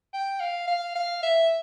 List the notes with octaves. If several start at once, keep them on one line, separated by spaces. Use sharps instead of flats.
G5
F5
F5
F5
E5